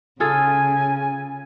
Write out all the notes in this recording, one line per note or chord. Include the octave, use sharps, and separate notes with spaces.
C#3 F4 G#4 A4 G#5